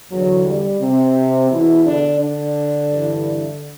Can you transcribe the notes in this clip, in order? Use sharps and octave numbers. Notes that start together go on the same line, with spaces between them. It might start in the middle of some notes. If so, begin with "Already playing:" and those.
E2 D3 F#3
G3
C3 C4
E2 B2 E3 E4
D3 D4
D3 D4
G2 E3